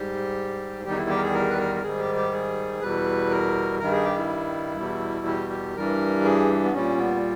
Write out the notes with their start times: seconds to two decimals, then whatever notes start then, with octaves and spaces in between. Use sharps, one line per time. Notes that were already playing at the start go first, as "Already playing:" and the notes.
Already playing: G#2 G3 G4
0.84 E2 D#3 G3 G4
0.91 D#4
0.97 E4
1.09 G4
1.17 A#4
1.22 G#4
1.34 A#4
1.50 B4
1.58 A#4
1.76 A#4
1.82 G#2 D#3 G3 G#4
1.99 G4
2.16 G4
2.32 G#4
2.80 E2 B2 G3 B4
3.30 A#4
3.79 G2 D#3 G3 A#4
3.92 G#4
4.03 G4
4.16 E4
4.77 E2 B2 G3
5.26 G4
5.50 G4
5.75 G2 E3 G3 A#4
6.24 G#4
6.64 B3
6.74 A#2 G3 C#4
6.98 B3